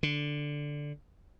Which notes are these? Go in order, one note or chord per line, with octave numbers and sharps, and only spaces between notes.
D3